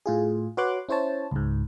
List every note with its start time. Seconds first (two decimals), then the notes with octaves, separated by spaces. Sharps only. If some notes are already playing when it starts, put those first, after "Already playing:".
0.06 A2 F4 G#4
0.57 F#4 B4 C#5 C6 D6 F#6
0.89 C#4 E4 C5 C#5 A5
1.31 C#2 G#2